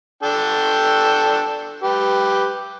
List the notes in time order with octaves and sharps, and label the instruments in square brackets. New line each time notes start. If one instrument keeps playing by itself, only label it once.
[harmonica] D4 A4 G5
G4 B4